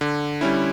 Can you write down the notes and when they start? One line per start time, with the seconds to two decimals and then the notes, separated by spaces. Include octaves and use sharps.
0.01 D3
0.41 G3 C#4 E4